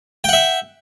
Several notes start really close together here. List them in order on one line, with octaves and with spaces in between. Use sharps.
G5 F#5 E5